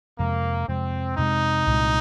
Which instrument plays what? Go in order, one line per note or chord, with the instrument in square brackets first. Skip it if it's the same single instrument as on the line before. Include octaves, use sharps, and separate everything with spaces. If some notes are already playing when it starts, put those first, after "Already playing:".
[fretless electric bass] F2 C3 G#3 [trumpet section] A#3
[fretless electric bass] F2 C3 G#3 [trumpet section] C4
[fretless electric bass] F2 C3 G#3 [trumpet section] D#4
[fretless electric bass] C2 A#2 G#3